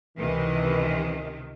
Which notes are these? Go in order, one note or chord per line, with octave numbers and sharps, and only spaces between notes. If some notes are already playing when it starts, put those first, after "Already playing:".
C#2 C3 D#3 E3